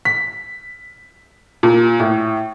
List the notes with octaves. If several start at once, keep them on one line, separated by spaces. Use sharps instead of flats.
B6
A#2
A2